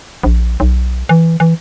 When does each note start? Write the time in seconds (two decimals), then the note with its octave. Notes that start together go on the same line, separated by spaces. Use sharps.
0.23 A#1
0.60 B1
1.09 E3
1.40 E3